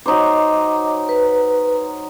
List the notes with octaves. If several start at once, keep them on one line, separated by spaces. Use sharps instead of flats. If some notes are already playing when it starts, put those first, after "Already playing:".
F#3 D#4 C5 D#5 D6
B4